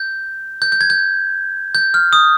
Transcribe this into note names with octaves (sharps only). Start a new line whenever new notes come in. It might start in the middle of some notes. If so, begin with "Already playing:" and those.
Already playing: G6
G6
G6
G#6
G6
G6
F6
D#6